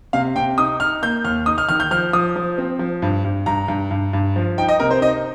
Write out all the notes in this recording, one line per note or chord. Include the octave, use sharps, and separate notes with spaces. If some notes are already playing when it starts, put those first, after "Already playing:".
C3 F5
C3 G5
D#4 D#6
D#4 F6
A#3 G6
D#2 F6
D#4 D#6
F6
D#3 F6
G6
F3 F6
F3 D#6
F3
C4
F3
G2
G2
G2 A#5
G2
G2
G2
F3
D#4 G5
D#5
C3 A#4
C5
D#4 D#5